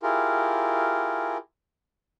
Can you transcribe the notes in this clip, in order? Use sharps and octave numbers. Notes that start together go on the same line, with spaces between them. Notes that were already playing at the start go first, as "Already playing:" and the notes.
E4 F4 G4 G#4 A#4